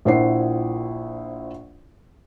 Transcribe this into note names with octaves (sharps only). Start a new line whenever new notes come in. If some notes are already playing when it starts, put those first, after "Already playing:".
A#1 A#2 E4 C5 F#5 C7